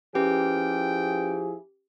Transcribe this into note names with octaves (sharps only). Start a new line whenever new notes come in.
F3 C#4 E4 G4 G#4 B4 G5